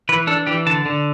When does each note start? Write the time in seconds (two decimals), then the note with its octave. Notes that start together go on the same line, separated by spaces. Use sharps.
0.09 E3 B4
0.27 D4 A4
0.47 E3 G4
0.66 D3 A5
0.86 D3